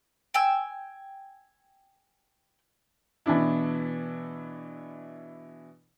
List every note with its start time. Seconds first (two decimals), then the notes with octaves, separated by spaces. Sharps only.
0.34 G5 G#5 E6
3.26 B2 E3 B3 D4 E4